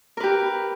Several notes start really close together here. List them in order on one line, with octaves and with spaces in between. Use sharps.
A#4 B4 G4